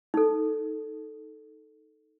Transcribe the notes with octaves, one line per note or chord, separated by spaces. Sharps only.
D#4 A4